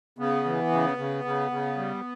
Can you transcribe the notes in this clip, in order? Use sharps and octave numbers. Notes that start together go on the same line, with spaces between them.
C#3 B3
E3
C#3
C#3
C#3
C#3
G3